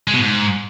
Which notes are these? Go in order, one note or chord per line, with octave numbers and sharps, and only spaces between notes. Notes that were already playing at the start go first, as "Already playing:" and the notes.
G#3
B2
G#2